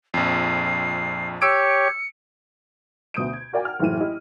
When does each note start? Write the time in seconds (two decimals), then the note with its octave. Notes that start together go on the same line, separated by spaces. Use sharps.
0.14 A#1 F2 C7
1.42 G4 C#5 E6 C#7 D7
3.14 D2 B2 D#6 G6 D7
3.33 G#6
3.53 F#4 A#4 D5 F5 G5 G#5
3.65 F#5 F6
3.79 F#1 A2 E3 D#7
4.00 E4 G4 D#5